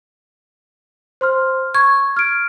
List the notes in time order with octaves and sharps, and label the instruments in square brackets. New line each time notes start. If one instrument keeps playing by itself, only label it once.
[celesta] C5 C6 F6
[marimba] C#6 [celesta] G#6
[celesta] F6 G#6 D7